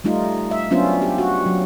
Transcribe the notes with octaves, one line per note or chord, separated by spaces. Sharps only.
G3 A3 D#4 F4
E5
F#3 B3 C#4 D4 F4 C5
G4
F#4
F#3